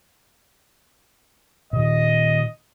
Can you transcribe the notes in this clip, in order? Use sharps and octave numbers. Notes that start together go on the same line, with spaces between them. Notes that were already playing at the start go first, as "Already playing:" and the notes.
A#2 D#3 D#5